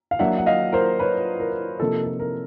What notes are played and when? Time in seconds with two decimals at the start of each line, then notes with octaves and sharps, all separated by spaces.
0.11 F5
0.19 F#3 A#3 D4 E5 F#5
0.38 F#5
0.46 D#5 F5
0.73 A#4 C5
0.99 B4 C#5
1.40 A#4
1.80 C3 F3 A#3 D#4 A4
2.04 A4
2.20 A#4